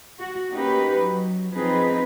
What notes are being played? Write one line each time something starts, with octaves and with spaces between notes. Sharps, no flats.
F#4
A#3 C#4 D#4 G4 B4
F#3
F3 C4 D#4 G#4 B4